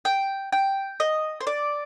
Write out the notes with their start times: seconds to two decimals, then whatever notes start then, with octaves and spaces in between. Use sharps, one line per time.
0.05 G5
0.52 G5
1.00 D#5
1.41 C5
1.47 D5